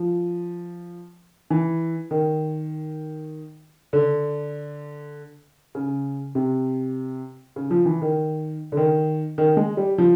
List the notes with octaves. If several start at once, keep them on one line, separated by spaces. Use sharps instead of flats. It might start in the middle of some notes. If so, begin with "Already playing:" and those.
Already playing: F3
E3
D#3
D3
C#3
C3
C#3
F3
E3
D#3
D3
D#3
D#3
G#3
G3
F3